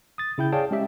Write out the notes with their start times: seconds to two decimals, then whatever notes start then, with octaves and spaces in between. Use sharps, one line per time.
0.18 D#6 A6
0.38 C#3 E4 G5 G6
0.52 G#4 C#5 D5 F5 G5 A5
0.71 G#3 C#4 G4 E5